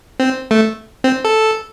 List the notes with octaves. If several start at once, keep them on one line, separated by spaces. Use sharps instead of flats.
C4
A3
C4
A4